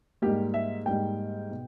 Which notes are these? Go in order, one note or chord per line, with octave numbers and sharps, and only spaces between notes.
G#2 G3 A#3 G4
E5
G#2 G3 A#3 G5
B2